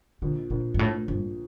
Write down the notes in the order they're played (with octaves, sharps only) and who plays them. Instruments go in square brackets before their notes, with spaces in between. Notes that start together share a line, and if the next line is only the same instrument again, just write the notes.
[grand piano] A#1 [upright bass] D3
[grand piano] A#1 [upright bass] A#2
[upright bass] G2
[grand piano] A#1 [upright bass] A2
[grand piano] A#1 [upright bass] G2